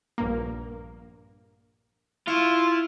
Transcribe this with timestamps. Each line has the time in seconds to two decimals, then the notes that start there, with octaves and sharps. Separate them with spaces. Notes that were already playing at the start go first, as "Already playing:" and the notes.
0.18 A#1 G2 A#3
2.28 E4 F4 C#6